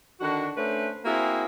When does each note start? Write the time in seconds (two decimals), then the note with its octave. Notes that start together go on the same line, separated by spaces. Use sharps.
0.20 D3 D#3 D4 F#4
0.56 A3 C#4 D4 B4 C5
1.05 A#3 C4 E4 F#4 G#4